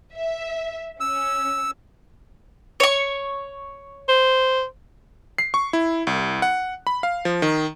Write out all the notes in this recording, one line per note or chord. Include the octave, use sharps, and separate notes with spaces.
E5
C#4 E6
C#5 C#6
C5
C7
C#6
E4
C2
F#5
B5
F5
F3
D#3